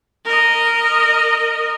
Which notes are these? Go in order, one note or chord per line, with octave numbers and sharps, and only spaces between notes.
A#4 D#5